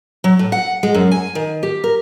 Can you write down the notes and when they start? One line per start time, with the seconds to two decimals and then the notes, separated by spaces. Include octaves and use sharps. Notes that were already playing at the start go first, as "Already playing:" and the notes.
0.24 F#3
0.39 A2
0.52 F#5
0.83 G#3
0.94 F#2
1.11 G#5
1.35 D#3
1.63 G4
1.84 A#4